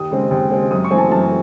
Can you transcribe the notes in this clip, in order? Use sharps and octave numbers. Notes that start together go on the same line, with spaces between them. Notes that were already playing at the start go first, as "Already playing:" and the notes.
Already playing: D#2 D#6
C#3 G#3 C4
D#2
C#3 G#3 C4
F#2 D#6
C#6
E3 A3 C4 G#5
A5
F#2 A5